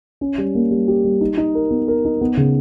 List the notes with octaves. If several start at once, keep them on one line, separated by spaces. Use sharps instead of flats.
C#4
G3
A#3
G3
G4
G3
D#4
D#4
A#4
B3
A#4
D#4
B3
C#3